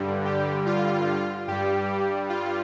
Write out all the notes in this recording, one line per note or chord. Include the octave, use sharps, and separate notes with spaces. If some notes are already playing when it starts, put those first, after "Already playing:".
Already playing: G2 D3 G3
G4
F4
G2 G3 G4
F4